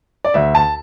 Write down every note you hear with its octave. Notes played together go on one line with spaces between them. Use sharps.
D5
D2 E5
A5